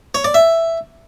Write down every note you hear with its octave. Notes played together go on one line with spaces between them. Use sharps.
C#5
D5
E5